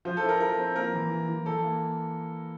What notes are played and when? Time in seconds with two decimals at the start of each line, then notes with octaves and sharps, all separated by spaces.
0.05 F3 C5
0.17 A4
0.23 E4
0.28 A#4
0.40 F3 A#4
0.58 C4
0.75 A#3 A#4
0.93 E3
1.11 E3
1.28 E3
1.46 E3 A4
1.63 A#3